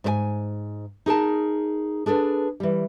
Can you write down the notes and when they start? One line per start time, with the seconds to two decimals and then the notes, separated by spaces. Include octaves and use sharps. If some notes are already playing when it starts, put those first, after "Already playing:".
0.04 G#2 C5 G#5
1.06 D#4 G#4 A#4 A5
2.06 D4 G#4 A4 B4
2.60 E3 G3